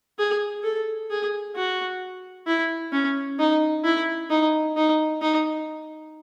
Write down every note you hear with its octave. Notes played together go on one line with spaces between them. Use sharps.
G#4
A4
G#4
F#4
E4
C#4
D#4
E4
D#4
D#4
D#4